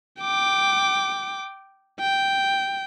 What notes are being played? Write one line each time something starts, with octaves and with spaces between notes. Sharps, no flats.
G5 D6
G5